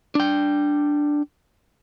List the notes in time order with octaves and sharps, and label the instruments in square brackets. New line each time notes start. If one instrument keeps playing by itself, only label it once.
[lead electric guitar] D4 G5